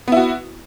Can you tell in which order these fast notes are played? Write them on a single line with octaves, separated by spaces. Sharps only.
B3 E4 F#4